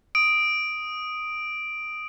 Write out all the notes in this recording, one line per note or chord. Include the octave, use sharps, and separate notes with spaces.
D#6 D7